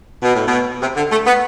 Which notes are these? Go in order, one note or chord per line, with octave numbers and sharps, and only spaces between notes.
B2
A2
B2
C3
D3
A3
B3